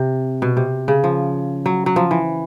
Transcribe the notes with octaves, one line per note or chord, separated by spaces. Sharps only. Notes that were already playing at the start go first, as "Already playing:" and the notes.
Already playing: C3
B2
C3
C#3
F3
F#3
F#3
F3
E3